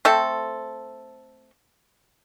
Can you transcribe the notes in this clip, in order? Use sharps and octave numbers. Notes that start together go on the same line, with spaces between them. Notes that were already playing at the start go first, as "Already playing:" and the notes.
A3 C4 A4